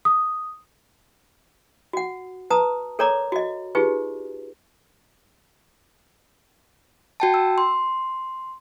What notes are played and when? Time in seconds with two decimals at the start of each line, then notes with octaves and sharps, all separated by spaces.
0.05 D#6
1.93 F#4 F#5
2.50 B4 A5 A#5 D#6
2.99 A4 A#4 C#5 D5 A#5 D6
3.32 F#4 D#5
3.75 D#4 F4 G4 G#4 B4
7.20 F#4 G5 A5
7.34 E6
7.58 C6